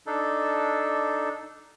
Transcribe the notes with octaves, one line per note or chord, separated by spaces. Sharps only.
D4 D#4 A4